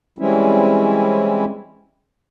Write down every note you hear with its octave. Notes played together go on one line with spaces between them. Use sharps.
E3 G3 G#3 C4 C#4 E4